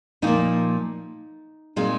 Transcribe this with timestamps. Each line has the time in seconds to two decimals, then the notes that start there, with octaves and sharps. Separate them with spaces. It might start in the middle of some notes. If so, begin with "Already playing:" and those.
0.22 A#2 F3 A#3 D#4
1.76 A#2 G#3 C4 D#4